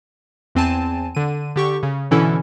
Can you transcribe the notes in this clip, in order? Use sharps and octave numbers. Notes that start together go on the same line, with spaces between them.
E2 C4 G#5 A5 D#7
D3 D#7
D3 G4 C#6
C#3
B2 D3 E3 C#4 E4 A4